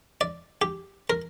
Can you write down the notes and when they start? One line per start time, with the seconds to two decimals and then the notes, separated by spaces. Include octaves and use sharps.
0.21 D5
0.62 G4
1.10 A#4